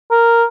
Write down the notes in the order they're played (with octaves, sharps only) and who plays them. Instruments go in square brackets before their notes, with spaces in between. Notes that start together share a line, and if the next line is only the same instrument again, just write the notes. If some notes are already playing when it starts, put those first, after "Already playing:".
[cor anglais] A#4